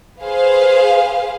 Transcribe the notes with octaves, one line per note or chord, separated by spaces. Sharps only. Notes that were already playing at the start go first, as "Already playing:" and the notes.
G#4 B4 C5 F5